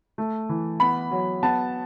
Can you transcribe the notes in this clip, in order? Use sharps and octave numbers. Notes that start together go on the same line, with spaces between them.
A3
E3
B3 B5
F#3
B3 A5